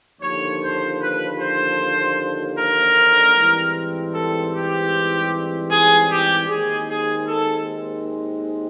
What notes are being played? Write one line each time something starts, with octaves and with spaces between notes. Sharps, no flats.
D#2 D3 F3 C#5
C5
B4
C5
A#4
G#2 E3 G3 C4
A4
G4
G#4
G4
D#2 D#3 G#3 C4 G#4
G#4
A4